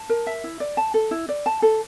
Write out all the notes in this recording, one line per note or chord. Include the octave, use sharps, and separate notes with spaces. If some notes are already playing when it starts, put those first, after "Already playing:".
Already playing: A5
A#4
E5
E4
D5
A5
A4
E4
D5
A5
A4